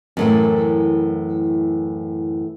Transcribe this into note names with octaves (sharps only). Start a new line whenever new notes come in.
F#2 A2 E3